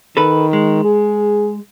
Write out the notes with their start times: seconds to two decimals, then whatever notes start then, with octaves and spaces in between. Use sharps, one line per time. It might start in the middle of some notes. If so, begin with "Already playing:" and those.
0.17 D#3 A4 B4
0.53 G#3
0.84 G#4